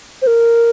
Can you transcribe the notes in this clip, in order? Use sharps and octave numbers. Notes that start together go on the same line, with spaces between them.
C5
A#4